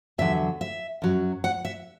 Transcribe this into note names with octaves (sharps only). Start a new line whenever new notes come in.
E2 D3 F#3 E5
E5
F#2 F#3
F#5
E5